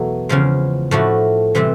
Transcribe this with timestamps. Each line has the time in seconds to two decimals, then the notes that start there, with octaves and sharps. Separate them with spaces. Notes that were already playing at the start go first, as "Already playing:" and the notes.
Already playing: E2 B2 F#3 A3
0.29 E2 C#3 F3 G#3
0.91 A2 F3 A3 D4 F#4
1.55 C3 E3 G3 C4